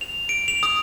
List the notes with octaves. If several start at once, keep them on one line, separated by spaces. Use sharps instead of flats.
F7
D7
F7
D#6